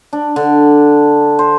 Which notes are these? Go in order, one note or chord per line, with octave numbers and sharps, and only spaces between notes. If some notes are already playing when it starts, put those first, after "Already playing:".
D4
D3
C5